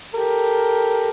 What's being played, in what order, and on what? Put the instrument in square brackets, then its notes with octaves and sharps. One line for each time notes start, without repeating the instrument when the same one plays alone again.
[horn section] G4 A4 A#4